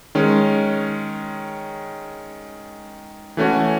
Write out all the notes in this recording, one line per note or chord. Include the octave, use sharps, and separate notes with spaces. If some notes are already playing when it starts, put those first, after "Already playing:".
D#3 G#3 C#4
E3 A3 C#4 F#4